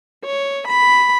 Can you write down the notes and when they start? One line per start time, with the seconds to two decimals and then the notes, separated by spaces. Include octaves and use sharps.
0.25 C#5
0.68 B5